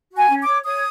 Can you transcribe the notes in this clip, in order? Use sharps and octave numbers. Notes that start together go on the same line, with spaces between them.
F#4
G#5
C#4
D6
C#5
C#5 D#6